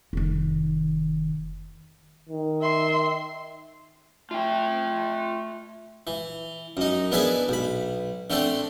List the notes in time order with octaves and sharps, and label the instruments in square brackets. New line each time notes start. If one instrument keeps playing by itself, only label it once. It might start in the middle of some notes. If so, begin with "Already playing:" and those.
[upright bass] F1 D#3
[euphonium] D#3
[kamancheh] E5 C6
[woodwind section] A3 [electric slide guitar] F4 G5
[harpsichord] E3
F#2 D#4
B3 D4 E4 G#4 B4 E5
B1 B5
D3 A3 C4 D4 A4 C5